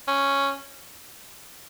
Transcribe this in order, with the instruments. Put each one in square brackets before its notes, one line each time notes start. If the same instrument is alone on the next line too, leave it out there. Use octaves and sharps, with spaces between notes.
[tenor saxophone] C#4